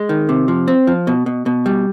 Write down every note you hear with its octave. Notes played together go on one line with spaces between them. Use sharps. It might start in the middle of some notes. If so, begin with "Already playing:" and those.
Already playing: G#3
D#3
C3
F3
C4
F3
B2
B2
B2
G3